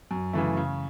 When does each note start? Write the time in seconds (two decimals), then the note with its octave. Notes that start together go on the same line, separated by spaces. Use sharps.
0.11 F#2
0.34 C#3 E3 A3
0.57 C#3